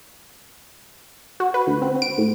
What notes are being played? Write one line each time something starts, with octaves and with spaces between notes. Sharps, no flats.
F#4
B4
D2
C4
D7
A2